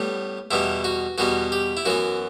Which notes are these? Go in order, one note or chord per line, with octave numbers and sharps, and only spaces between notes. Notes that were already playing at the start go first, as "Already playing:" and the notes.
Already playing: A2 G3 B3
E2 B2 G3 B3 E4
F#4
E2 B2 G3 B3 F#4
G4
E4
F#2 E3 B3 F#4